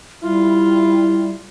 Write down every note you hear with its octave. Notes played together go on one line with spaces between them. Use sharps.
G3 E4 F4